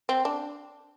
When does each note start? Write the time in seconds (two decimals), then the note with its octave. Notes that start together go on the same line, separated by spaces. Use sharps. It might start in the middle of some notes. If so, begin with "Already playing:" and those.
0.09 C4
0.25 D4